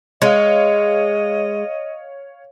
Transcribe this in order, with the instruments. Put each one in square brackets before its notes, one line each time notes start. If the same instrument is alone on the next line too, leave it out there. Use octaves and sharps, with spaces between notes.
[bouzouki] G#3 [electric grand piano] C#5 F5 [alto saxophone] D#5